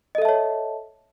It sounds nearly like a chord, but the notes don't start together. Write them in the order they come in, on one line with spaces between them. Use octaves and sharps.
D#5 A4 E5 A5 C#5